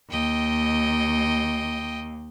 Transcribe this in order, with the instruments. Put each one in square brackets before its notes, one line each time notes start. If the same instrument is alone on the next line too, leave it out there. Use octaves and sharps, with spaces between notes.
[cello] D#2 [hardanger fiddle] D#5 G5